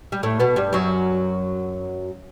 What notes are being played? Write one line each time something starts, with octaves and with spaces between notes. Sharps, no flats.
G3
A2 A3
B2 B3
G2 G3
F#2 F#3